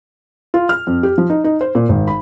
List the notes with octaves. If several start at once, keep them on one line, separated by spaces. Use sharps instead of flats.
F4
F6
F2
G4
F3
D#4
D#4
C5
A#2
G#1
B5